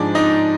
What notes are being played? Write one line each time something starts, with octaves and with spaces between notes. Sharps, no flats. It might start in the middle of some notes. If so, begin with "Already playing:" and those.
Already playing: G#2 F3 G#3 D4 D5
D#4 D#5